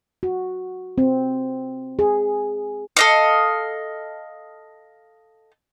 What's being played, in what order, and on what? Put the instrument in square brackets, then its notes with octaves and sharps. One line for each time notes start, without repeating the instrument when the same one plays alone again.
[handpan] F#4
C4
G#4
[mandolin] A4 D#5 F5